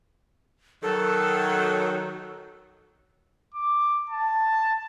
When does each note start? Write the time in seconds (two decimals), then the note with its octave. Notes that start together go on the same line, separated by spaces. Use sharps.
0.83 D#3 F#3 A4
3.54 D6
4.10 A5